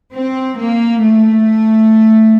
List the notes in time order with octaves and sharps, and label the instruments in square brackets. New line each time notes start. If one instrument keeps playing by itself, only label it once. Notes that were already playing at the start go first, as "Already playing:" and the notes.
[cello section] C4
A#3
A3